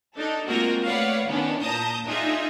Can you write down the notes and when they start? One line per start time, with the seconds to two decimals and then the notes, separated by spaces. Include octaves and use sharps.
0.17 D4 D#4 A4
0.47 G#3 A#3 C4 F4 F#4 A#4
0.85 A3 B4 C#5 D5 F5 F#5
1.27 D#3 E3 B3 C#4 D4
1.61 A#2 A5 A#5 D#6 G6
2.05 D4 D#4 F4 G#4 E5